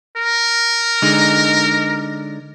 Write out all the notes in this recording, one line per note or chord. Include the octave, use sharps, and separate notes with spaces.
A#4
D3 G#3 D#4